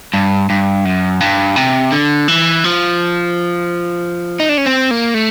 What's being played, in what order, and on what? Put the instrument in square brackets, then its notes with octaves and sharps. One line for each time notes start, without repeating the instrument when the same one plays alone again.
[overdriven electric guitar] G2
G2
F#2
G2
C3
D3
E3
F3
D#4
D4
C#4
C4
A#3
A3